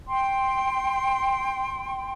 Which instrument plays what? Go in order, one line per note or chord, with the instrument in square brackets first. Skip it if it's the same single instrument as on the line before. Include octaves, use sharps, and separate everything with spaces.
[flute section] G5 C6